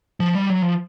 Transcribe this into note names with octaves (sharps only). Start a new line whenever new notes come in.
F3
G3
F#3
F3